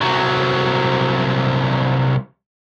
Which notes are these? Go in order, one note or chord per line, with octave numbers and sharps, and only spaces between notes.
C2 F#3